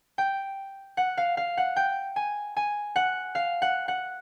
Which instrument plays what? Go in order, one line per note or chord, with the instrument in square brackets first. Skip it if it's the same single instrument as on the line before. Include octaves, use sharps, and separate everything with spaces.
[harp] G5
F#5
F5
F5
F#5
G5
G#5
G#5
F#5
F5
F#5
F#5